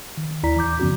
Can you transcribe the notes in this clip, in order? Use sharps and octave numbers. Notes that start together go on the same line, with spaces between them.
D#3
D#2 E4 D5 A#5 B6
E3 A#5 D6 G6
F#2 C#3 F3 B3 C#4 F#4